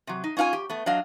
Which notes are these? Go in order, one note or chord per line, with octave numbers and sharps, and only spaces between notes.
C3 F#3
D#4
C#4 D#4 F4 F5 G#5
G4
A3 B3
F#3 D4 D#5 F5